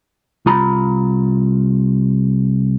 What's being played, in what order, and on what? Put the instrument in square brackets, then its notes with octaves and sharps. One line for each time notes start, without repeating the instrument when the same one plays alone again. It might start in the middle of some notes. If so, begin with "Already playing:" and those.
[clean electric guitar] C2 F4 A#5 B5